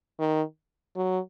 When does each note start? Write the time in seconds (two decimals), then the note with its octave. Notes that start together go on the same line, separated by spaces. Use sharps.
0.19 D#3
0.96 F#3